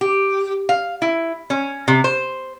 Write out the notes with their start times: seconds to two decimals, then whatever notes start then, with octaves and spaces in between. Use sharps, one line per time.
0.01 G4
0.69 F5
1.02 E4
1.50 C#4
1.88 C3
2.04 C5